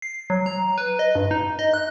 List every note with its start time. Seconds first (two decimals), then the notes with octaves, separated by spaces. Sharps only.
0.02 C7
0.30 F#3
0.46 A#5
0.78 B4
0.99 D#5
1.15 G2
1.31 D#4
1.59 D#5
1.74 F#6